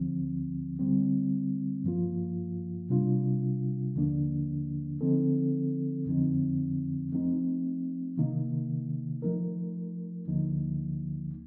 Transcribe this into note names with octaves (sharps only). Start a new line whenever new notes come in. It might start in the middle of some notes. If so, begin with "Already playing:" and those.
Already playing: D2 D3 F3 C4
D3 G3 C4
G2 F3 A#3 F4
C3 G3 D4 F4
D#2 D3 F3 A#3 D4
D3 F3 C4 D#4 A4
F2 D3 F3 C4 D#4
F3 A3 C4 D#4
C3 D#3 A#3 D#4
F3 A3 D#4 A#4
D2 D3 F3 A#3 D#4